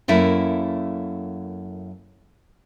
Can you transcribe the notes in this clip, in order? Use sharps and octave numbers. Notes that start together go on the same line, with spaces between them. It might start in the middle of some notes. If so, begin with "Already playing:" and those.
F#2 A3 A#3 E4